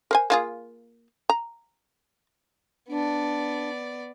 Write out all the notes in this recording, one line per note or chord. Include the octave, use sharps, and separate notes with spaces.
A#4 C5 G#5
A#3 F4 G#4
A#5
B3 D4 D5